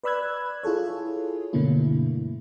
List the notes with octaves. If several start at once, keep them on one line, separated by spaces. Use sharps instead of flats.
B4 D5 B5 E6 F#6 G#6
E4 F4 G#4 A4 C#5
G2 B2 D3 A3 A#3 E4